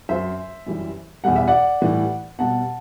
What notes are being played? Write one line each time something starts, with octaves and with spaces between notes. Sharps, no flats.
F#2 F#3 C5 E5
F#2 E3 G3
E2 B2 G3 F#5
E5
D5 F#5
A2 E3 G3
B2 G3 F#5 A5